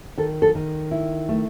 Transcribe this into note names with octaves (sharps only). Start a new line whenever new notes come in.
D#3 A4
A4
D#3
E4
A3